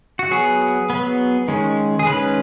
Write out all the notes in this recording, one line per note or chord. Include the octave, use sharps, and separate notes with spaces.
F#4
F#3 B3 G#4
F#3 B3
D#3 G#3 C#4
G#4
D#3 G#3 C#4 B4